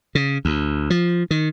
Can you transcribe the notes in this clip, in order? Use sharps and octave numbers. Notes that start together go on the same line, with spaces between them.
C#3
D2
F3
D#3